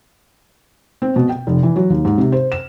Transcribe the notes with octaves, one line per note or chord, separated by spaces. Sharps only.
C4
B2
G5
F1
E3
F#3
D#2
G#2
C3
C5
E7